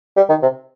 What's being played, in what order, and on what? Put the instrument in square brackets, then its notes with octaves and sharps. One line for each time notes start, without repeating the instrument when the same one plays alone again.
[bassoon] G3
D#3
C3